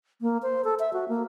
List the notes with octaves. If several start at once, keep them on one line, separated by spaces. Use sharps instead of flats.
A#3
C5
A4
E5
F#4
A#3